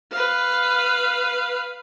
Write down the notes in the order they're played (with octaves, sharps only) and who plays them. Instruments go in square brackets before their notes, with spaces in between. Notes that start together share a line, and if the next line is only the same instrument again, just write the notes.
[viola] B4 F5